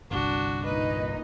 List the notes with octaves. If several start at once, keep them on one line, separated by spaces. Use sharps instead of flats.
G1 C2 D4 F#4
A#2 D#4 B4 D#5